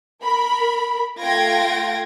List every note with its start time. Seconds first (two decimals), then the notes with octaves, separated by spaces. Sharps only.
0.23 A#4 B5
1.20 A3 F4 G5 G#6 A#6 D7